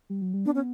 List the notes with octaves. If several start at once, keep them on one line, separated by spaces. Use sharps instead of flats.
G3
F#3
G3
B3 D4
C#4